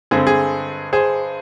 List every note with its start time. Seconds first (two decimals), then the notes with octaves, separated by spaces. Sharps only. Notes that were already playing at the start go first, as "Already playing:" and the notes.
0.11 G2 D3 G#3 C4 G#4
0.27 G#4
0.93 G#4 C5